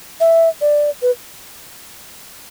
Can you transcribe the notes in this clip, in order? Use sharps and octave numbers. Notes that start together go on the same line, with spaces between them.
E5
D5
B4